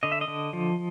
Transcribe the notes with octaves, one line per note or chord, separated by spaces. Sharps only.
D3 D#5
E5
D#5
D3
F3